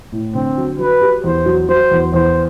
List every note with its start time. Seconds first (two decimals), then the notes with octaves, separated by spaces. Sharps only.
0.12 A2
0.35 D3 C4
0.57 F#3
0.79 F#3 B4
1.01 G4
1.24 E2 C5
1.46 F#3
1.69 F#3 C5
1.91 E2
2.14 E2 C5